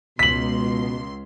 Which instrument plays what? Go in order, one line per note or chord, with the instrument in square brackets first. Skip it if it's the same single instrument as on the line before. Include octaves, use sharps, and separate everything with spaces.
[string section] C#2 C6 [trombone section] B2 [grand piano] B6 F#7